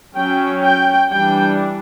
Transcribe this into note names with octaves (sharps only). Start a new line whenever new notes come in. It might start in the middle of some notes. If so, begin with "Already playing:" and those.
F#3 C#4 G5
G5
E3 G3 D4 G5